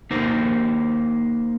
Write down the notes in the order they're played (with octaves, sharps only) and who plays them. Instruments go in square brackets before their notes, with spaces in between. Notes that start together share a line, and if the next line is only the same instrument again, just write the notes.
[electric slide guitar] A#3 D#4 A#4 C5